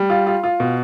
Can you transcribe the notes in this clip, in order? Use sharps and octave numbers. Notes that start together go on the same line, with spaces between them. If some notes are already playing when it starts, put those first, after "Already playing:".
Already playing: G3
F4
F4
F4
B2